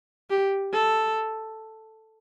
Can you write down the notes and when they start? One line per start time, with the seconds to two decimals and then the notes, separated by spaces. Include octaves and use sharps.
0.30 G4
0.73 A4